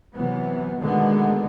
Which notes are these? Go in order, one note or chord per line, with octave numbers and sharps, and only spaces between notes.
C3 E3 F#3 B3
B2 D3 D#3 G#3 A3 B3